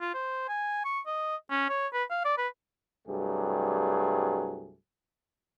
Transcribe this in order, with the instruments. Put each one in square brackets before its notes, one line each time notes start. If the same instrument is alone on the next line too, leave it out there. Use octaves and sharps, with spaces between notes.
[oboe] F4
C5
G#5
C#6
D#5
C#4
C#5
B4
F5
D5
B4
[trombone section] C2 G2 F#3 A3 G4 G#4